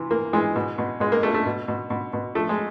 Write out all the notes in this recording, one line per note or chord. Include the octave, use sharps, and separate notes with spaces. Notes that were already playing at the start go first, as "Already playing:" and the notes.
Already playing: C3 E3
E3 A#3
E3 G#3
B2
B2
B2 G#3
A#3
B2 A3
A3
B2
B2
B2
B2
F3 A3
G#3